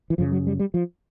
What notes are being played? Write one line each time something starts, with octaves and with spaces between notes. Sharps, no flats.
E3
F#2 C#3 F3
F#3
G3
G3
F3